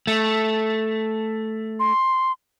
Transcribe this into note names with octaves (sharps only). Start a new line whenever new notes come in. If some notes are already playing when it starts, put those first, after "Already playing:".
A3
C6